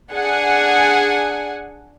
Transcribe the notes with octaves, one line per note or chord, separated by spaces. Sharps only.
D4 G#4 F#5 G#5